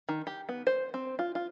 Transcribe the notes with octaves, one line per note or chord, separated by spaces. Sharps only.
D#3
G4
B3
C5
C4
F4
F4